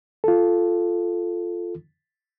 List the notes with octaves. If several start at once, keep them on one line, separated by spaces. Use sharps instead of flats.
F4 A4